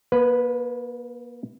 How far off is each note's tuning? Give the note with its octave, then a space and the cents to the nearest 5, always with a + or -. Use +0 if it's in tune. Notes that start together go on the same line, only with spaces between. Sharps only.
A#3 +35 B4 +0